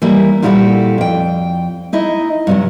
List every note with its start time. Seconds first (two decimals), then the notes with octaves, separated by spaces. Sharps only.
0.02 E3 G3 A#3 E4
0.42 A#2 G3 E4 F#4 G#4 A4
0.98 F2 G5
1.93 D#4 E4 D#5
2.47 G2 C3 F#3